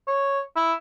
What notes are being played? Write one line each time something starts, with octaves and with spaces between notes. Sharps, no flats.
C#5
E4